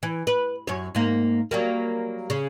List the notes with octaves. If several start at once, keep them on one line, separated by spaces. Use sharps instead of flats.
E3
B4
F#2 C#5
G#2 A#3
F#3 G3 A#3
C#3